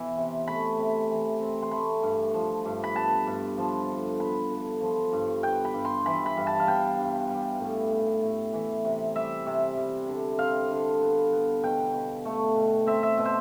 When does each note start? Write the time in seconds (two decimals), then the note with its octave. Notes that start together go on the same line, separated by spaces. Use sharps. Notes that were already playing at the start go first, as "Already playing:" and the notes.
Already playing: B2 E3
0.17 C3
0.47 A3 B5
0.78 C3
1.10 E3
1.41 C4
1.63 C6
1.71 A3 B5
2.03 G2
2.34 F3
2.65 G2
2.84 B5
2.96 B3 A5
3.26 G2
3.57 F3
3.89 D3
4.20 B3 B5
4.51 D3
4.81 F3
5.13 G2
5.43 B3 G5
5.65 B5
5.74 G2
5.85 C6
6.06 E3 B5
6.26 B5
6.37 G2
6.47 A5
6.60 F5
6.68 B3 G5
6.99 G2
7.30 G3
7.60 A2
7.91 B3
8.22 A2
8.53 E3
8.85 C3
9.15 G3 E5
9.46 C3
9.77 G3
10.08 D3
10.39 C4 F5
10.71 D3
11.01 B3
11.32 B3
11.63 B2 G5
11.94 B2
12.25 A3
12.56 B2
12.87 C4 E5
13.03 E5
13.18 B2
13.25 C5